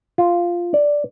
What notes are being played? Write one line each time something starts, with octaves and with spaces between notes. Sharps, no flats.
F4
D5